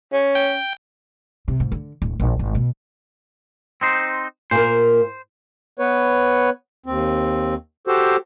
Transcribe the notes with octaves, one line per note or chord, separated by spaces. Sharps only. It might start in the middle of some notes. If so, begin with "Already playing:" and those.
C#4
G5
C3
G#2
D3
D1
A#1
G#1
B2
C4 D#4 C5
A#2 A#4 C5
B3 B4 C#5
D#2 C4
F#4 G4 A4 C5